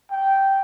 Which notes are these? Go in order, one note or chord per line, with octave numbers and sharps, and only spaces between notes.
G5